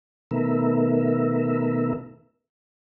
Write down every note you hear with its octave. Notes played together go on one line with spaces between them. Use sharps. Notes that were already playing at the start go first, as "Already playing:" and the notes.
B2 D#3 A3 B3 A#4 E5